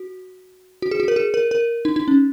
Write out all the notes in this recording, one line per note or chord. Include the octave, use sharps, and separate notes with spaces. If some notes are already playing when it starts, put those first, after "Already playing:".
Already playing: F#4
F#4
G#4
F#4
A#4
G#4
A#4
A#4
D#4
D#4
C#4